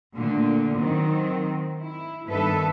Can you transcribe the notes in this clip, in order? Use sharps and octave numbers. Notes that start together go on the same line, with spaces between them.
A#2 D3 A3
D#3 F#3 C4
E4
G2 D#3 B3 A4 B4 E5